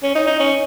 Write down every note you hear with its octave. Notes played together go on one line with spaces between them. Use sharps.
C#4
D#4
D#4
C#4